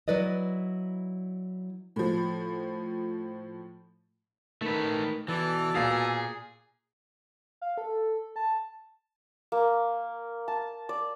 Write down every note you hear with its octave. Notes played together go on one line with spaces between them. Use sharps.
F#3 E4 B4 D5 D#5
A2 F3
D#3 A3 B4
B2 E3 A4 D5 A5
A#2 G#4 F5
F5
A4
A5
A#3
A5
D5